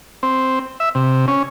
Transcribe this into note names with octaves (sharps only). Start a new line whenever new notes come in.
C4
E5
C3
C#4